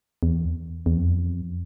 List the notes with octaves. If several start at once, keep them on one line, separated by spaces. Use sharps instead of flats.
E2
E2
F2